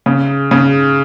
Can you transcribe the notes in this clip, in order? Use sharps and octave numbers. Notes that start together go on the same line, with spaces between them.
C#3
C#3